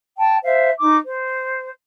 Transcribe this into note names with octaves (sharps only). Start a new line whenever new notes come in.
G5 A5
C5 E5 F5
D#4 D6
C5